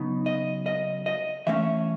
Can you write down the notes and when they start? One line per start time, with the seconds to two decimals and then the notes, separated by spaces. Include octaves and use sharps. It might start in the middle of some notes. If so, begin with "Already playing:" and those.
Already playing: C#3 F#3 B3 D#4
0.26 D#5
0.66 D#5
1.06 D#5
1.47 E3 A3 C#4 E5